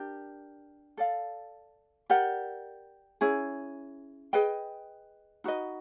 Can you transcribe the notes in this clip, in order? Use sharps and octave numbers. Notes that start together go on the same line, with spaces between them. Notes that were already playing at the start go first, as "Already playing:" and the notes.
Already playing: D4 G4 A#4
A4 D5 F5
G4 A#4 D5 F#5
C#4 E4 G#4
G#4 B4 D#5 G5
D#4 F#4 B4 D#5